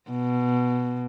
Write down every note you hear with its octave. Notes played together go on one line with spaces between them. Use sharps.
B2